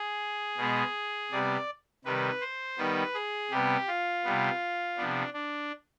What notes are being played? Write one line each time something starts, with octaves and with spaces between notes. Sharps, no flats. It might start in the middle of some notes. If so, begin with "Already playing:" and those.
Already playing: G#4
B2 G#3 B3
C3 G3 B3 D5
C3 D#3 G3 B4
C5
D#3 G3 B3 B4
G#4
C3 G3 B3 G4
F4
C3 G3 B3
C3 F3 B3 D4
D4